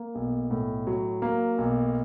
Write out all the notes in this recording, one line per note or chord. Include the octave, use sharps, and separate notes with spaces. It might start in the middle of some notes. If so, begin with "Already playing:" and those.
Already playing: A#3
B1
A2
F#3
A#3
B1